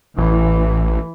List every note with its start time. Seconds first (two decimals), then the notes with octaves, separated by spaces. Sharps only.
0.18 A1 E3